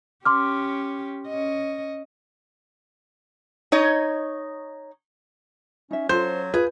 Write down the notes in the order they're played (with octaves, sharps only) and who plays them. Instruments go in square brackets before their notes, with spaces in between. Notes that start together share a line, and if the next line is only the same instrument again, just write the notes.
[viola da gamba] C#4 G4 [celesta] C6 D6 F6
[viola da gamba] C#4 D#5
[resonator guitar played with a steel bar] D#4 C#5 D#5
[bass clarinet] C#4 [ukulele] D#4 E5
[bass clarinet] F#3 [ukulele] C#4 F4 A4 [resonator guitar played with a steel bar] C5 [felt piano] G6
[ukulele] F4 [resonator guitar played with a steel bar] G#4 [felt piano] B4